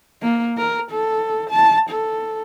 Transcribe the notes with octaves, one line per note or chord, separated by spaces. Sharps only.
A#3
A#4
A4
A5
A4